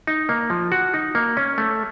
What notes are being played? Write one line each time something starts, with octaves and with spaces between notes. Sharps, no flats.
D#4
A#3
F3
F#4
D#4
A#3
C#4
A3